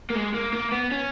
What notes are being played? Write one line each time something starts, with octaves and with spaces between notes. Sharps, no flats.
A#3
G#3
A#3
A#3
B3
C#4